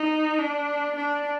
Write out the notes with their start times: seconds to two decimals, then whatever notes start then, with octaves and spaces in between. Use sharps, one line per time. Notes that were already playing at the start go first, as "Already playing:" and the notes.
Already playing: D#4
0.39 D4
0.96 D4